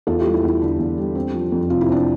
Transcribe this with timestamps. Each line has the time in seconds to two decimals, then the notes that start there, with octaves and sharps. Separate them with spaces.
0.07 E2 F4 A4
0.20 E4 G4
0.26 G3
0.34 E4
0.43 E2
0.48 E4
0.62 D3 D4
0.79 E2
0.98 G3
1.15 C4
1.34 F3
1.52 F2
1.70 C3 F4
1.81 E4
1.89 C4 D4